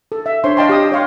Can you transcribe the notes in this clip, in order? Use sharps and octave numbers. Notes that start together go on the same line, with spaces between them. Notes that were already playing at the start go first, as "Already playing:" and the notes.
A4
E5
D4 C5 C#5 C6
D5 D#5 F5 G5 A5 C6
G4 D#6
C#5 F5 C6